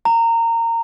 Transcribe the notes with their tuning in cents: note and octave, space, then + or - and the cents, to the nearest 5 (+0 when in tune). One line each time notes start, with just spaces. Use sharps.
A#5 -20